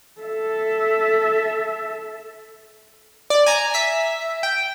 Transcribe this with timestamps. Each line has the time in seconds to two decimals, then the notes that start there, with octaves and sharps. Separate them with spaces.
0.21 A4 E5
3.30 D5
3.46 G#5 A#5
3.74 E5 B6
4.43 G5